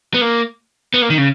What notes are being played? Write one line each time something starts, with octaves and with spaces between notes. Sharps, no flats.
B3
A#3
B3
A#3
D#3
C#3